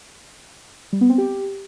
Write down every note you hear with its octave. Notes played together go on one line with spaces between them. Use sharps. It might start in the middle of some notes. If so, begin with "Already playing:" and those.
G3
B3
C4
G4